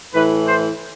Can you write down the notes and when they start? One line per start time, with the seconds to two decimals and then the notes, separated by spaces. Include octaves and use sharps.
0.14 A2 E3 B4
0.48 C5